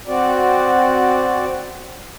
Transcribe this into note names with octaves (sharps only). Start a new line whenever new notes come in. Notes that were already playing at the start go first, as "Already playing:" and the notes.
C4 F#4 D5